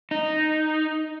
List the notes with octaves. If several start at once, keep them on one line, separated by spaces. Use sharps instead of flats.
D#4